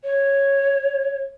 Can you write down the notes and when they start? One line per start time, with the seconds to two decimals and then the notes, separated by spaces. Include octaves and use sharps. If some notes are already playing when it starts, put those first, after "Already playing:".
0.04 C#5